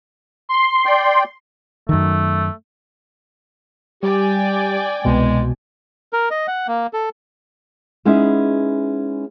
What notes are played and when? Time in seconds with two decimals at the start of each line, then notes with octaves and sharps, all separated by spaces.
0.49 C6
0.85 D5 G5
1.89 F#2 D#3 A3
4.03 G3 G4 D5 G5 G#5
5.05 C2 B2 G#3
6.13 A#4
6.31 D#5
6.48 F#5
6.68 A#3
6.93 A4
8.05 G#3 B3 C#4 D#4 E4